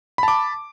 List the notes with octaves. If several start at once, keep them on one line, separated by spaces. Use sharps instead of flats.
A5 B5 D6